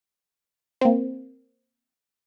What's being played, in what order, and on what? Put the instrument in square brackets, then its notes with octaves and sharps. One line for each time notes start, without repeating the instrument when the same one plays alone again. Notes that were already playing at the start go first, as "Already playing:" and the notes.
[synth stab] A#3 C4